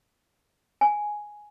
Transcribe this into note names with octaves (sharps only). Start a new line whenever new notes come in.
G#5